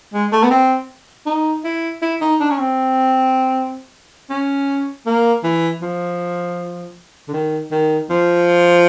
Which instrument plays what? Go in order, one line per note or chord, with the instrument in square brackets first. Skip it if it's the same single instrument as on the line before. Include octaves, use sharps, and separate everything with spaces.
[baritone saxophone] G#3
A3
B3
C4
D#4
E4
E4
D#4
D4
C#4
C4
C#4
A#3
E3
F3
D3
D#3
D#3
F3